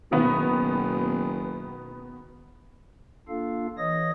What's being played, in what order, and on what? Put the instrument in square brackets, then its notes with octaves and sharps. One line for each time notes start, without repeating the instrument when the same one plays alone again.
[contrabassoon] F#1 [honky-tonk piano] B2 D#3 B3
[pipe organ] A#3 D4 F4 A4 F5
E3 C#5 D#5 D#6 A#6